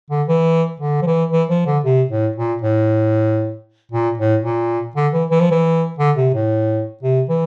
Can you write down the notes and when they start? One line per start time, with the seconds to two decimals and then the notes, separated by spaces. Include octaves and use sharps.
0.10 D3
0.28 E3
0.80 D3
1.02 F3
1.07 E3
1.32 E3
1.49 F3
1.66 D3
1.84 C3
2.09 A2
2.36 A#2
2.62 A2
3.92 A#2
4.18 A2
4.43 A#2
4.96 D3
5.13 E3
5.30 E3
5.41 F3
5.51 E3
5.99 D3
6.17 C3
6.34 A2
7.03 C3
7.29 E3